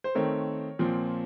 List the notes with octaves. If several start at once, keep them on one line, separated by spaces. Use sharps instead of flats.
C5
D#3 A3 C4 A#4 C#5
A#2 F3 C4